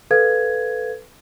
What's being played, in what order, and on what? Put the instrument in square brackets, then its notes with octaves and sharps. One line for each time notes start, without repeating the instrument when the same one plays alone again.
[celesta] A4 B4 F5 G#6